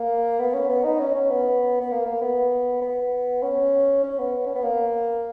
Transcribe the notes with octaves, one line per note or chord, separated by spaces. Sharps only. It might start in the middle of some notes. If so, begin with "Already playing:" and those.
Already playing: A#3
B3
C#4
B3
D#4
C#4
C#4
B3
B3
A#3
A#3
B3
B3
C#4
C#4
B3
C#4
B3
A#3